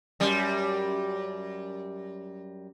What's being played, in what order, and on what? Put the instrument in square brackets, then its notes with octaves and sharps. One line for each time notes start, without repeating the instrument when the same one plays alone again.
[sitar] F#2 G3